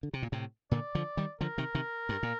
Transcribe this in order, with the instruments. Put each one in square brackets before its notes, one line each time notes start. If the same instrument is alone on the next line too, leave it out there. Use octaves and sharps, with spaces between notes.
[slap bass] D3
C3
A#2
A2 C3
[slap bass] A#2 D3 [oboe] D5
[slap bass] D3 F3
D#3 G3
[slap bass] D3 F3 [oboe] A#4
[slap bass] C3 D#3
C3 D#3
G2
A#2